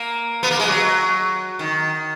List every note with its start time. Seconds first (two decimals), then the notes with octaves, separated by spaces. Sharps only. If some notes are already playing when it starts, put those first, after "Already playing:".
Already playing: A#3
0.43 B3
0.51 A#3
0.60 G#3
0.67 F#3
1.59 D#3